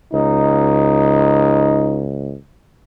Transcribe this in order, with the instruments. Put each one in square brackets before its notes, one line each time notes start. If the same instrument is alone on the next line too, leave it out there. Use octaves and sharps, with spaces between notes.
[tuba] C#2 [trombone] D#4